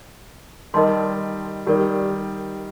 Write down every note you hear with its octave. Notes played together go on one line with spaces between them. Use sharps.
D#3 G3 A#4 D#5 A5 C6
D#3 G3 G4 A#4 D5